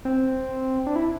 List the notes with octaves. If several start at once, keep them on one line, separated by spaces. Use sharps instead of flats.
C4
D4
E4